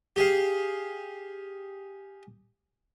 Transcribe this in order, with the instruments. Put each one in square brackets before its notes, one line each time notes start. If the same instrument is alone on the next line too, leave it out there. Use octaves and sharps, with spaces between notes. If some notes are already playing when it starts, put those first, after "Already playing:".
[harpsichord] G4 G#4 F5